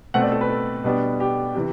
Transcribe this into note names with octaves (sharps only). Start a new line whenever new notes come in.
B2 A3 C4 F#5
D5
A4
B4
A4
B2 G3 B3 D4
G4
C3 E3